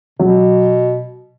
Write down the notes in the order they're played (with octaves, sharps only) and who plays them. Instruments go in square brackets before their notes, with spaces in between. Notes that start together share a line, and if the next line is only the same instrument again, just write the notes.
[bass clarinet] B2 [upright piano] F#3